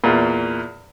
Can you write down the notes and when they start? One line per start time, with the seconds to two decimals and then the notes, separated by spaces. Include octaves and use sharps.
0.04 E2 A#2